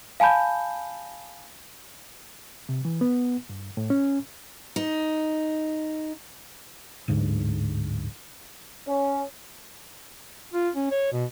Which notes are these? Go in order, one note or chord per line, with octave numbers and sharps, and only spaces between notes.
F5 G#5 A5 B5 G6
C3
E3
B3
G2
A2
C#4
D#4
D1 G#2 D3
C#4
F4
C#4
C#5
B2